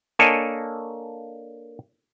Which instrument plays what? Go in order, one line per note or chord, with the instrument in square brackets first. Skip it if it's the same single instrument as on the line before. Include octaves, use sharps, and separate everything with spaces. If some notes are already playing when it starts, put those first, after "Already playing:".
[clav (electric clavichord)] A#3 D4 A4 C#5 D#5 G#5